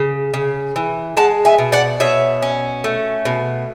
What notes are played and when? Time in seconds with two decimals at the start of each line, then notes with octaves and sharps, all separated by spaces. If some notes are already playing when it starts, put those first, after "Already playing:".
Already playing: C#3
0.34 C#3
0.76 E3
1.17 G#3 F#5 A5
1.45 E5 G#5
1.58 B2
1.72 D5 F#5
2.00 B2 C#5 E5
2.42 C#4
2.84 A3
3.25 B2